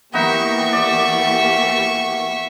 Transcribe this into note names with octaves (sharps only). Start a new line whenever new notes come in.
E3 A#3 B3 D#4 F#4 G4 E5 C#6
D5